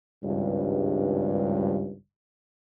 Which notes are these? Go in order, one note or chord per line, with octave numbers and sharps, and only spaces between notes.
G#1 C#2 G2